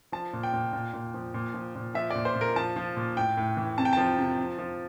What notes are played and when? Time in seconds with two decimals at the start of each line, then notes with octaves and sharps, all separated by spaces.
0.12 F3 A5
0.33 A#2
0.43 G5
0.53 A#2
0.73 A#2
0.93 A#2
1.14 F3
1.34 A#2
1.54 F3
1.75 A#2
1.94 F3 E5
2.10 A#2 D5
2.25 C5
2.35 A#2
2.41 A#4
2.56 F3 A5
2.76 F3
2.96 A#2
3.16 A2 G5
3.37 A2
3.57 E3
3.78 C3 A5
3.85 G5
3.93 F3 A5
4.18 C3
4.38 F3
4.58 F3